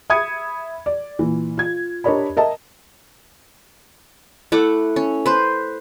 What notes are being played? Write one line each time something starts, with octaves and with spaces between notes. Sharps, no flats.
E5 B5 D#6 G#6 C#7
D5
A#2 E3
F4 G#6
D4 G4 A#4 C#5 D#5 B5
A#4 D#5 E5 A5
A3 E4 F#5 D6
C#4
B4 C5